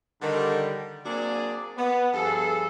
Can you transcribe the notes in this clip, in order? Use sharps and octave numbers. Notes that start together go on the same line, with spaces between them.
D3 D#3 G3
F#3 A#3 C4 D4 G#4 D5
B3
G2 F3 G#4 A4